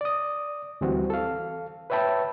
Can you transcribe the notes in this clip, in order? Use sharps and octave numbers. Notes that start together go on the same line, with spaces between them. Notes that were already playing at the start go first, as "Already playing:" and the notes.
D5 D#6
D2 E3 G3 C4 F#4
A4 F5
B4 C#5 E5 G5 A5 B5